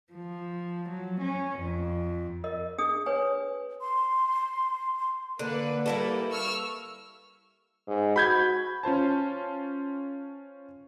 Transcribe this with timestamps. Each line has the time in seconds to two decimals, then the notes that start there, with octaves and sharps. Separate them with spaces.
0.13 F3
0.90 F#3
1.22 C#4
1.60 F2
2.44 A#4 D#5
2.78 D4 G#4 D#6
3.06 B4 C#5 G#5
3.81 C6
5.39 D3 A#3 B4
5.86 G3 A#3 E4 A4 B4
6.30 C#6 E6 F6
7.87 G#2
8.16 F#4 B5 G6 G#6
8.83 C#4 F4 C5 A5